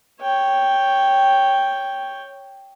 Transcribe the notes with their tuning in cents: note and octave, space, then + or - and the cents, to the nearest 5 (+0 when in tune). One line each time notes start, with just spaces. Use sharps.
C#5 +0 G5 +0